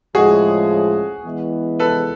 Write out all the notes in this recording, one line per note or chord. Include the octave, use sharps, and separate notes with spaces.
A2 F3 G#3 C#4 F#4 G#4
E3 G#3 B3 E4
A4 B4